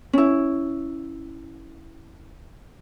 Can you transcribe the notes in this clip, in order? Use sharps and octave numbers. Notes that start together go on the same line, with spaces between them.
C#4 E4